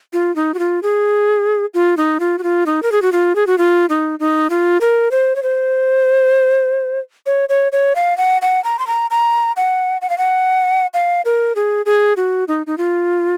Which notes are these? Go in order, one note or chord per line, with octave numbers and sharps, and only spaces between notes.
F4
D#4
F#4
F4
G#4
F4
D#4
F4
F#4
F4
D#4
A#4
G#4
F#4
F4
G#4
F#4
F4
D#4
D#4
F4
A#4
C5
C#5
C5
C#5
C#5
C#5
F5
F#5
F#5
A#5
C6
A#5
A#5
F#5
F#5
F5
F#5
F5
A#4
G#4
G#4
F#4
D#4
D#4
F4